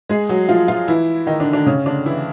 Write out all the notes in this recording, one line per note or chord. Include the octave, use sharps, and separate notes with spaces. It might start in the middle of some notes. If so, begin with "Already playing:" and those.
G#3 G#4
F#3 F#4
F3 F4
F3 F4
E3 E4
D#3 D#4
D3 D4
D3 D4
C#3 C#4
D3 D4
E3 E4